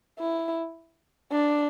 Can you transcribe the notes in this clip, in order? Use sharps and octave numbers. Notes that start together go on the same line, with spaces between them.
E4
D4